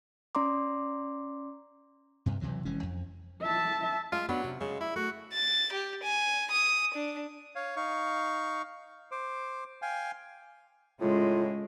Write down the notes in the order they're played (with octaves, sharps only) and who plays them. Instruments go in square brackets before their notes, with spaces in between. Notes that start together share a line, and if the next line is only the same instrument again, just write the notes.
[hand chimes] C#4 D5 A#5 C6 D6
[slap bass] D2 G2 C3
B1 C3 E3 F#3
F1 E3 G#3 C#4
F2
[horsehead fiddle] E5 A5
[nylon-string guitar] G#3 E5 [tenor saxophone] F4
[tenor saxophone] F#3 [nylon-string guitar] B3 D4 B4
[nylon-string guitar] C3
[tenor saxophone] C#3 [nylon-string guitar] G#3
[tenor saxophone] E4 [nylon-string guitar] D5
[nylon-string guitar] A3 [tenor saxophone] F#4
[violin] A6
G4
G#5
D#6
D4
[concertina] C#5 F5
D#4 F5 C#6
C5 D6
F5 G5 G#5
[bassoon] A2 [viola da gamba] C#3 G#3 [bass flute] F4